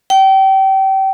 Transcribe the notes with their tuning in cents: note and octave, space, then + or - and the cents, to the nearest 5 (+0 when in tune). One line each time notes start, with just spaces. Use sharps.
G5 -30